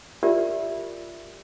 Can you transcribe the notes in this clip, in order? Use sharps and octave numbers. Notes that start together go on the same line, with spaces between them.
F4 G4 A#4 D5 E5